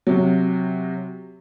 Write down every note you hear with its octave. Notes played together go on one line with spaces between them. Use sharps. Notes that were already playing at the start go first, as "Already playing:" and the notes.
C3 F#3